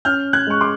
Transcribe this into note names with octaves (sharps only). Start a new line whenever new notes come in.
C#4 F6 G6
F#6 G#6
G#3 C#6
C6 D6